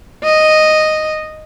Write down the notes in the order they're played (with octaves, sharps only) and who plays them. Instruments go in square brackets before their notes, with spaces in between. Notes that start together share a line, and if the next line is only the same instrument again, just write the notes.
[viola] D#5